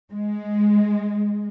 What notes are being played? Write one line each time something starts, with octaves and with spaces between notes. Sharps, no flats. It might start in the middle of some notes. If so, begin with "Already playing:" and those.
G#3